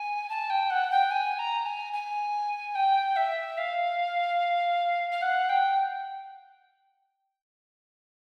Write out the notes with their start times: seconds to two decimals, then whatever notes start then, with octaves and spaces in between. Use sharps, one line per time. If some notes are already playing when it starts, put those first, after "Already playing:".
Already playing: G#5
0.29 A5
0.49 G5
0.70 F#5
0.90 G5
1.10 G#5
1.38 A#5
1.65 G#5
1.92 G#5
2.74 G5
3.16 E5
3.57 F5
5.11 F5
5.21 F#5
5.48 G5